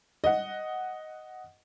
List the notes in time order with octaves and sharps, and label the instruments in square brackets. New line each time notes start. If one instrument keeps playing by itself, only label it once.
[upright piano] D#5 F#5